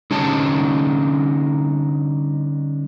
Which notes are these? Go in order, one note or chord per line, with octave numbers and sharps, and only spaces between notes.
D3 G3 C#4 D#4 C#5 A5